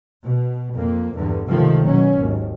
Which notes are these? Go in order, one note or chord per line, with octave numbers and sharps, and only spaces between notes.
B2
F2 A#3
E2 G2 D3
C#2 C3 D#3 F3 A3
F#1 B2 F#3 C#4
G#1 D#2